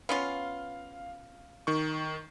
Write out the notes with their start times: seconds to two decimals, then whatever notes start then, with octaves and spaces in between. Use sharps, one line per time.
0.09 B3 C#4 F4 F5
1.67 D#3 C#6